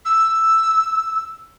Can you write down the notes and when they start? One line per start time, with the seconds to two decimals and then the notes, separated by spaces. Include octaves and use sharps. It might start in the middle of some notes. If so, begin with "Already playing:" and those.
0.05 E6